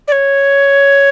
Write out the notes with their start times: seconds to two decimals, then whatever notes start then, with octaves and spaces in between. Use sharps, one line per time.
0.08 D5
0.12 C#5